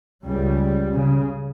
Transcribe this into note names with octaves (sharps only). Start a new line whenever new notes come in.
C#2 C#3 G3
C#3